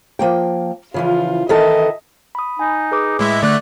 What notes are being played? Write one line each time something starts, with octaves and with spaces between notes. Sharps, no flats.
F3 A#3 G5
C#3 E3 F3 F4
D#3 E3 A4 D#5 E5
B5 D#6
D#4 G#5
G#4 B4 D6
A2 G#3 E4 E5
D3 A3 D5 F#6